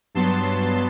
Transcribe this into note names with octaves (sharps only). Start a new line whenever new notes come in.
G2 F#3 B3 A5 C6